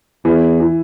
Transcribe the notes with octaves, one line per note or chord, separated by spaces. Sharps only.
E2 E3
E3